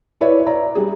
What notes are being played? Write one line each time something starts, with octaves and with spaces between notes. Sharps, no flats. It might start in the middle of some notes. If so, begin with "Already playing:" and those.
E4 B4 C#5 D5 E5
D5 E5 A#5
G3 G#4